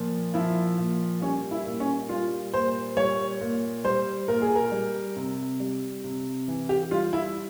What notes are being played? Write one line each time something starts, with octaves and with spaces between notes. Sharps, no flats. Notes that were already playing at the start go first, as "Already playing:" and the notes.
Already playing: A#2 F3
F3 E4
A#2
G3 C#4
E4
A#2
C#4
G3 F4
A#2 C5
G3 C#5
A#2
G3 C5
A#2 A#4
G#4
A#4
G3
C3
G3
C3
E3
G4
G3 F4
E4